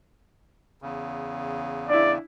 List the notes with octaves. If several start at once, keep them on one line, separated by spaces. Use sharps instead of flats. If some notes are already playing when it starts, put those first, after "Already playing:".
E2 C#3
D4 E4 D5